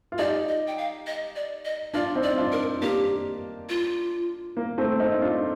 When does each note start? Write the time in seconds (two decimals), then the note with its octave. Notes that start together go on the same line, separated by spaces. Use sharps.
0.12 F4
0.19 D#4 G4 D5
0.49 D#5
0.67 G5
0.78 F5
1.07 D#5
1.36 D5
1.65 D#5
1.94 D4 F4 D5
2.15 C4 D#4
2.23 D5
2.37 D4 F4
2.52 A#4
2.81 A#3 D4 G4
3.69 F4
4.57 A#3
4.78 A3 C4
5.00 C4 D#4
5.22 D4 F4